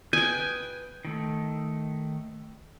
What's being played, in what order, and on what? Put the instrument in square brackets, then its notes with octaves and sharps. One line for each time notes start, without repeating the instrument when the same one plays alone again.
[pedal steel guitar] B4 D#6 G6 [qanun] G5 G#5
[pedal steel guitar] D#3 A3